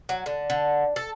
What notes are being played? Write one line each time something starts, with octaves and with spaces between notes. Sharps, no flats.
F#3
D3
D3
A4